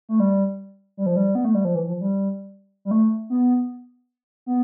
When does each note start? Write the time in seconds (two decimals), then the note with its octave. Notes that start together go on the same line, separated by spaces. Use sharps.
0.09 A3
0.20 G3
0.97 G3
1.06 F3
1.16 G3
1.35 B3
1.45 A3
1.55 G3
1.65 F3
1.75 E3
1.88 F3
2.01 G3
2.85 G3
2.91 A3
3.30 B3
4.46 B3